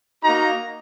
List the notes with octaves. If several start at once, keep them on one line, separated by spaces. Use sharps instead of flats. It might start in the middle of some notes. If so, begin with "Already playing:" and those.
A#3 D#4 F#4 A#5